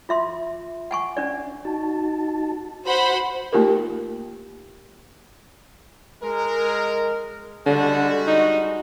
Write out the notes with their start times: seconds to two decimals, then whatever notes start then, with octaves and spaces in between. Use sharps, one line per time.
0.09 F4 E5 C6
0.91 F#5 G#5 C#6
1.17 C#4 D4 D5
1.65 D#4 F#4 A5
2.86 F#4 C5 F#5 B5
3.53 A3 A#3 D#4 F4 G4 A#4
6.22 G#3 A#4
7.66 D3 G3 G#3 F#4
8.27 D#4